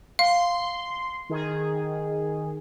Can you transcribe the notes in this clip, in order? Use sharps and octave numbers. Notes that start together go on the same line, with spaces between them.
F5 C6
D#3 G#4